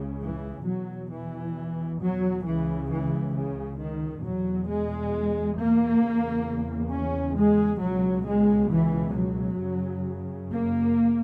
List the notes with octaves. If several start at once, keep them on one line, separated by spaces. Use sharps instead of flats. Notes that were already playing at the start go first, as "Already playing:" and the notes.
Already playing: C#2 C#3
E3
E2 B2 F#3
E3
F#3
C#2 C#3 E3
E3
C#3
D#3
E2 B2 F#3
G#3
A#3
E2 C#3
C#4
G#3
C#2 B2 F#3
G#3
E3
F#3
F#2 C#3
A#3